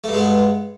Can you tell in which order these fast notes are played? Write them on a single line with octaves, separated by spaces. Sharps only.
A3 G2 G#3 B3